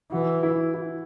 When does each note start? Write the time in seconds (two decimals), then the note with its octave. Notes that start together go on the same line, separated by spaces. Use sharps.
0.11 E3 F#4
0.43 E4
0.74 E4